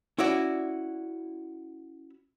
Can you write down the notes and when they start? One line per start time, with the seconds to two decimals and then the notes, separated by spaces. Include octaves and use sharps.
0.19 C#4 E4 F#4 D5